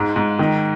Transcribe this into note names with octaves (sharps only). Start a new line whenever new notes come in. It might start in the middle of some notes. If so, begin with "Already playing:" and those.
Already playing: G#2 G#3
G#2
D#3